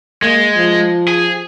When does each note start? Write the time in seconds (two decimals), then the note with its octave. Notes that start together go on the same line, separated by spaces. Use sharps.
0.22 G#3 A#3
0.56 F3
1.08 G#4